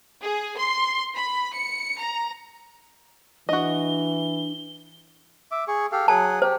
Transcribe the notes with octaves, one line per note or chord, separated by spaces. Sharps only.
G#4
C6
B5
C#7
A#5
E3 D4 F#4 D#5 G7
E5 D6
G#4 C#6
G4 A4 F5
F#3 G#4 F#5 A5
G4 C5